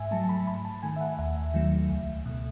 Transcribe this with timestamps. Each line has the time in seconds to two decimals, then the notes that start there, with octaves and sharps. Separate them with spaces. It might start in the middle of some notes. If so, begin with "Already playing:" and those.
Already playing: G#2 E5 G#5
0.11 F#3 A3 A5
0.24 A5
0.29 B5
0.47 G#2 B5
0.65 A5
0.83 D#3 A3 G#5
0.96 E5
1.01 F#5
1.19 D#2 E5
1.54 D#3 F#3 A3
1.90 C#2
2.25 B2 A3